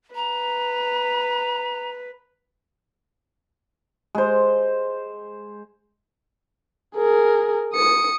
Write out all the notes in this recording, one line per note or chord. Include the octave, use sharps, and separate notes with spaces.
B4 A#5
G#3 C5
G#4 A#4
D#6 C#7